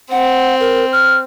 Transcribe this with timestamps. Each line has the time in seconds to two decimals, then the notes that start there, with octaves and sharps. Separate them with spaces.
0.11 C4 F#5
0.60 A#4
0.92 F6